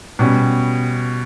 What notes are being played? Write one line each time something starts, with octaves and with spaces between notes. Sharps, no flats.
B2 G3 C#4